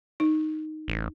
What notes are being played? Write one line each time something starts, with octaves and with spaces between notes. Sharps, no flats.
D#4
A1